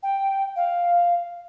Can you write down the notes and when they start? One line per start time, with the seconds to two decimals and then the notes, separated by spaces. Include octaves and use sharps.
0.03 G5
0.56 F5